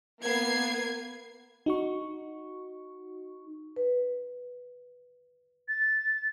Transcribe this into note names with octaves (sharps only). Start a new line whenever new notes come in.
A#3 B3 G#6 C7
D#4 F#4 C#6
B4
A6